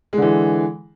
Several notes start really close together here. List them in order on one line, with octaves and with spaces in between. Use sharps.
G#3 D3 E3